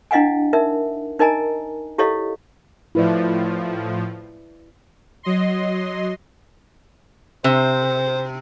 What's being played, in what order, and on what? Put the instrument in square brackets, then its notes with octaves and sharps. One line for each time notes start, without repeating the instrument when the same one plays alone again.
[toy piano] D4 E4 D#5 F5 F#5 G#5
D#4 A#4 E5
D#4 A#4 D#5 G#5 A#5
E4 G4 A4 C#5 D#5 F5
[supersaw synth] A2 F3 [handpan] E4 B4 D5
[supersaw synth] F#3 D#5 C6
[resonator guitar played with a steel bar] C3 [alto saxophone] C5